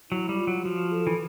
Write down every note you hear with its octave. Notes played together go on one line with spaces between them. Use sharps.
F#3 E4
G3
F4
F#3
F3 F#4
A4
E3